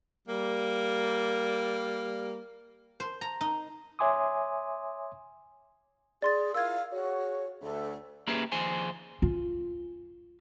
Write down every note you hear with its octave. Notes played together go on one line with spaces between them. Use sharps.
G3 A#3
C5
A#5
D#4
C#5 E5 G#5 C6 D6 D#6
G#4 D5 C6 A6
E4 F4 A#4 F5 E6 G#6
F#4 G#4 C#5
D2 A4
A#3 C#4 E4 G4 G#4 B4
D#2 F3 G#4 C5 G#5
F4